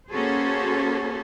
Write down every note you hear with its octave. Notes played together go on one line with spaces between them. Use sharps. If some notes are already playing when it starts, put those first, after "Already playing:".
A#3 C#4 F#4 G#4 A4 C5